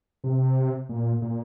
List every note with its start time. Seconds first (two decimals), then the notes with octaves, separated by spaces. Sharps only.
0.24 C3
0.89 A#2
1.22 A#2